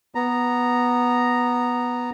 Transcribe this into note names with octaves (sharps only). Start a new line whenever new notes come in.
B3 A#5